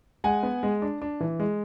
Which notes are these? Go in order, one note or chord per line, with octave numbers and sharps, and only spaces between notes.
G#3 F#5 G#5
B3
G#3
D4
D4
E3
G#3